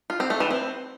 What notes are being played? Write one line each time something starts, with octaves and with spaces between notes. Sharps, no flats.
F4
C4
A3
E3
C4